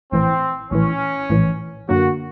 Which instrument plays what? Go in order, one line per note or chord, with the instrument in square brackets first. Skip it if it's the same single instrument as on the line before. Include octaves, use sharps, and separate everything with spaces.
[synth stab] A#1 A2 E3 [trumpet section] C4
[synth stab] A#1 A2 E3 [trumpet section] C#4
[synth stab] A#1 A2 E3
[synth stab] F#2 D3 F#3 A#3 [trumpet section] F#4